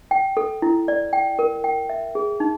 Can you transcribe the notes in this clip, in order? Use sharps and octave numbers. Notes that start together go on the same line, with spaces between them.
G5
A4
E4
D5
G5
A#4
G5
E5
G#4
D#4